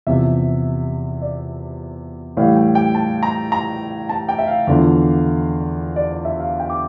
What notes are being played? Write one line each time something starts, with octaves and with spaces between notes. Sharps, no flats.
E2 C3 F3 E5
D5
A2 E3 G3 F5
G5
G5
A5
A#5
A#5
A5
G5
E5
F5
E2 D3 F3
D5
D5
E5
F5
G5
D6